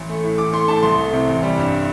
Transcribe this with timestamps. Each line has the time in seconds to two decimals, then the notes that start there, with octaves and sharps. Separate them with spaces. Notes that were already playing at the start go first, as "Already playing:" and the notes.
Already playing: A1
0.09 A3
0.24 A2
0.38 A1 D6
0.53 A3 C6
0.68 A2 A5
0.83 C2 C6
0.98 A3
1.13 C3
1.27 A1
1.43 G3
1.58 G2